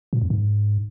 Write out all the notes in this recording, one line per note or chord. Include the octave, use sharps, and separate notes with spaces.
A#2
F2
G#2